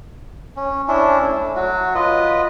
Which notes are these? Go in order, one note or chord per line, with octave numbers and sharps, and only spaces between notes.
C#4
C#4 D4 E4
A3
F#3 F#4
F4 B4 D#5